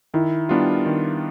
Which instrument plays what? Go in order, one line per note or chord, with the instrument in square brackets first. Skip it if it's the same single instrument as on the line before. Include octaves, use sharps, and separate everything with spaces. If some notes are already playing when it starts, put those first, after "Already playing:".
[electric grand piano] D#3 [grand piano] E4
[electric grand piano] G3 B3 D4 F4
D#3